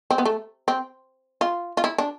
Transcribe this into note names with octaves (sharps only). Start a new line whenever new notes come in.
C4
B3
A3
C4
F4
F4
E4
D4